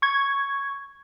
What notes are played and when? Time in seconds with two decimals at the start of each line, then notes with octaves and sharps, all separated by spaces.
0.02 C#6 G#6